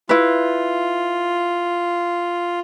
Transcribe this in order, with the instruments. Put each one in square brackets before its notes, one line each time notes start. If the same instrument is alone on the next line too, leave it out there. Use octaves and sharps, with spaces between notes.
[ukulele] E4 B4 [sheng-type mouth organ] F4